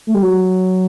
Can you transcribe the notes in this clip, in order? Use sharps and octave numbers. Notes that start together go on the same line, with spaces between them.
A3
G3
F#3